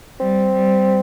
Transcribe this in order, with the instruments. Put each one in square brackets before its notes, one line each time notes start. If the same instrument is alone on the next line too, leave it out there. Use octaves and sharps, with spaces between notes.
[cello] G3 [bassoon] C4
[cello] G3